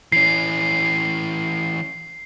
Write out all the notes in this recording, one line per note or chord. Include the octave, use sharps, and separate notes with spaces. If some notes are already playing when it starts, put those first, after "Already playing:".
E3 C#4 C7